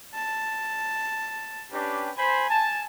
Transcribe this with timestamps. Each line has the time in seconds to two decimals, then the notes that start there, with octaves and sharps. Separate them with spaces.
0.14 A5
1.72 C#4 D4 G4 B4
2.17 C5 G#5 B5
2.50 A5